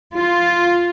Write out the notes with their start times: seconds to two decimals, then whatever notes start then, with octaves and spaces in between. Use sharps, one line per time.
0.14 F4